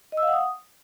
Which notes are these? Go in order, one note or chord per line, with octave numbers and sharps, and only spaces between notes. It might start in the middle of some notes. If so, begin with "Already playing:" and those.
D#5
E6
F5
F#5
D#6